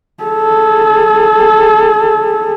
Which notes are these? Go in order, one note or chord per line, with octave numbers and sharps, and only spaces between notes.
G#4 A4